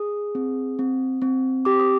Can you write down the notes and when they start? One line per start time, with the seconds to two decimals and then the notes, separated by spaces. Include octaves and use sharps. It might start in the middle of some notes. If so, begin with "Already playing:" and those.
Already playing: G#4 D#6
0.35 C4
0.79 C4
1.22 C4
1.65 G4 D6
1.80 D#6